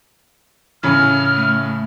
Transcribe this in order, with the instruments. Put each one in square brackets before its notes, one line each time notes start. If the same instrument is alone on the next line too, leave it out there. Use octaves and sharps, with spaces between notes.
[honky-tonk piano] A2 C#3 C#4 [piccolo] F6
[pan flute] A3